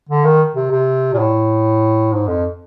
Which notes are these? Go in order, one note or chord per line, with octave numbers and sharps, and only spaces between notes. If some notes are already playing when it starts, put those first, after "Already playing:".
D3
D#3
C3
C3
A#2
A2
G#2
F2